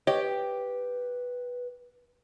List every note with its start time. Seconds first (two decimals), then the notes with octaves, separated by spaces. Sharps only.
0.07 G4 B4 C#5 D#5